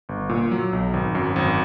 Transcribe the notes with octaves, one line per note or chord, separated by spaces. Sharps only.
G1
A#2
F#3
B1
G#1
F#2
G#1